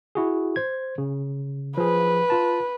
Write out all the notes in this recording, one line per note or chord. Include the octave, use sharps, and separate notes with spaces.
E4 F#4 G#4
C5 G#6
C#3
F3 G#4 B4
F4 A5